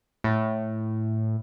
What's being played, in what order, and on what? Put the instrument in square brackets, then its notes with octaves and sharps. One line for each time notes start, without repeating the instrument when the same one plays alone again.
[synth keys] A2